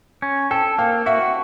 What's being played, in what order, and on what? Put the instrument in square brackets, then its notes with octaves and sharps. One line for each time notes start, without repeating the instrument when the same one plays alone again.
[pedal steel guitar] C#4
[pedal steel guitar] A4 [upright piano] G5 A5
[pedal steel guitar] A#3 [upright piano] F5 G5
[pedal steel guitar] F#4 [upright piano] E5 F#5